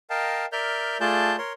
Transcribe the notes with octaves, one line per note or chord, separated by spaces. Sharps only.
A#4 D#5 F5 G5 A5
A#4 D5 E5 F6 G6
A3 F4 G#4 D5 A5 G6
A#4 C#5 C6